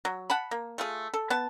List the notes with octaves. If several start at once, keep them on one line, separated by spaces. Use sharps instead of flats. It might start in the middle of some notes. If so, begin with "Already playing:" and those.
F#3
F#5 A5 B5
A#3
A3 F4 G#4
A4
B3 A5